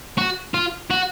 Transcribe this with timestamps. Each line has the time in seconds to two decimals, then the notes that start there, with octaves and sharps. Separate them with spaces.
0.18 F#4
0.54 F4
0.90 F#4